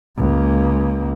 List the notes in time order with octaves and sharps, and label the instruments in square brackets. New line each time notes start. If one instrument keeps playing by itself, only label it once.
[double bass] C#2 A#3